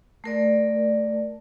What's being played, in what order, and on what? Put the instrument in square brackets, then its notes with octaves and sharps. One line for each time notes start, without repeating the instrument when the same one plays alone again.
[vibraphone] A3 A#4 D5